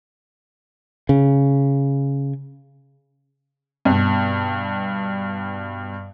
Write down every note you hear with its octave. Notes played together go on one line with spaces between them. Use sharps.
C#3
G2 B2